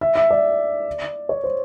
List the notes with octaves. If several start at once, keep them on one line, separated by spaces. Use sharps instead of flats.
E5
E5
D5
C#5
C5